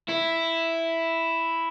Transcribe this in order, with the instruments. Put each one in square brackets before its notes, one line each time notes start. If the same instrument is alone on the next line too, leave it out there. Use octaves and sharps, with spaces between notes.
[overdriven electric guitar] E4